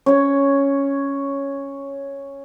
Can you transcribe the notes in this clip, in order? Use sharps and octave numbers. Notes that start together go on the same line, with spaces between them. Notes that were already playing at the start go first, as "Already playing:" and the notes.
C#4 C#5